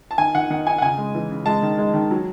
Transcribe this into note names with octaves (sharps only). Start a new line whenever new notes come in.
A5
D#3 G#5
D#3 F#5
D#3 F#5
D#4 G#5
F#5
C#3 G#5
G#3
E3
C#3
G#3 A5
D#3
G#3
D#3
F#3